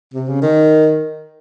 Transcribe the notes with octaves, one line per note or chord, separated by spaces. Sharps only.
C3
C#3
D#3